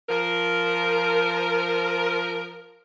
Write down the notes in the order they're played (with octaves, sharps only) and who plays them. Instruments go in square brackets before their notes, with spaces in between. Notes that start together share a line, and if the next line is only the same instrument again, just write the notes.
[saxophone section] F3 A#4